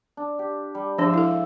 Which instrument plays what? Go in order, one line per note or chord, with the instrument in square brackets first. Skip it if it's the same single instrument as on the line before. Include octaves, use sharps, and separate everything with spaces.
[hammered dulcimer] D4
G4
G3
[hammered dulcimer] G#2 F4 E5 [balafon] F3 D4
[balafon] E4 A4